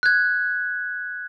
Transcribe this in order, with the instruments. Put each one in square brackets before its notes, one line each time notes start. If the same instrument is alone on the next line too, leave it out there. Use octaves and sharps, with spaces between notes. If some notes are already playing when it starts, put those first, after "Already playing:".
[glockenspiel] F#6 G#6